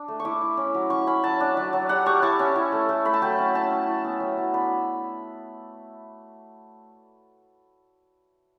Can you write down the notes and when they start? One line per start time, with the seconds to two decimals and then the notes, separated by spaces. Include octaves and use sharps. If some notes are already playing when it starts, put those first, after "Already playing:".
Already playing: D4
0.08 A3
0.20 C#6
0.25 E4 D6
0.41 E4
0.57 C#4
0.74 F#3
0.90 C#4 C#6
1.07 C#4 B5
1.24 F#3 A5
1.40 D4
1.57 F#3
1.73 F#3
1.89 G3 F#5
2.06 G3 C#6
2.22 E4 A5
2.39 C#4
2.56 E4
2.72 A3
2.89 A3
3.05 A3 B5
3.14 A5
3.22 F#3 G5
3.39 C#4
3.55 C#4 A5
3.71 C#4
3.87 E4
4.04 B3
4.20 F#3
4.38 F#3
4.54 D4 B5